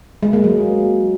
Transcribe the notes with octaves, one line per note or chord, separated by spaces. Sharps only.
G#3
A#3
F#3